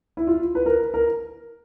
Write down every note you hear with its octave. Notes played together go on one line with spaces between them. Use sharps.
E4
F4
B4
A#4
A#4